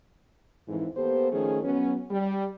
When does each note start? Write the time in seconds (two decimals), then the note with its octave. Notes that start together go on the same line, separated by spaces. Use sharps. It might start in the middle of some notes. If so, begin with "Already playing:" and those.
0.68 F2 G#2 E3
0.97 A#3 B3 G4 A4 C5
1.32 D#3 F3 A3 C#4 G#4
1.63 F#3 B3 C#4
2.11 G3